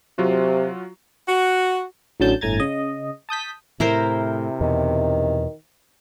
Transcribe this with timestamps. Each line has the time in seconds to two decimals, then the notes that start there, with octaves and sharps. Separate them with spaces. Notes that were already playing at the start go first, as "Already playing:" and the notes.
0.18 C3 F#3 F4 F#4
1.29 F#4
2.20 A1 D3 F#3 C#4 A5 G6
2.41 G1 A2 G#5 A#5 G#6 A6
2.60 C#3 D#5
3.29 A5 D#6 G6 B6
3.80 A2 C3 E4 A#4 C5
4.61 E2 B2 D#3